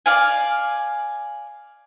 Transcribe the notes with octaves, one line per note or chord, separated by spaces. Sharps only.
D5 F5 G#5